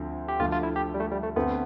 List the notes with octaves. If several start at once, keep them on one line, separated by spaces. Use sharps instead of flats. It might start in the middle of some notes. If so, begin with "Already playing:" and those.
Already playing: D2 D3 F3 C4
G4
D2 D3 F3 A3 F4
F4
E4
G4
G3
A3
G3
A3
D2 D3 A3 B3 C4